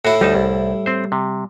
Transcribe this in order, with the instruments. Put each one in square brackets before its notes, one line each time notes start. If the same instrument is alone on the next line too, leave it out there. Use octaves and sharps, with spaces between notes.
[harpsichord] A2 E4 [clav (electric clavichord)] F#4
[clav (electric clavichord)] D2 D#4 A5 [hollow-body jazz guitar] G3
[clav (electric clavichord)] C2
C4 C5
C3